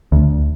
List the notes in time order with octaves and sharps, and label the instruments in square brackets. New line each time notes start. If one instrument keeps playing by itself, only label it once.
[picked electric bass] D2